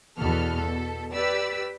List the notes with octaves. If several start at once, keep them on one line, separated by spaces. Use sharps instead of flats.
E2 B2 B3 A4 F6
B2 A4
G4 B4 D5 E6